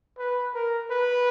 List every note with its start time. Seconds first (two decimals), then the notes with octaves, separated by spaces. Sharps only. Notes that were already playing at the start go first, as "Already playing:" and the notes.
0.18 B4
0.54 A#4
0.90 B4